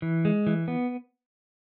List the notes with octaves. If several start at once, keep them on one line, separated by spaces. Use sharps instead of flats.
E3
G#3
E3
B3